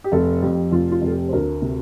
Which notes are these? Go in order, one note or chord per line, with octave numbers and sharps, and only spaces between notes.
G4
F1 A4
F2 G4
F1 F4
F4
F1
A4
G4
C5
D2 A#4
C3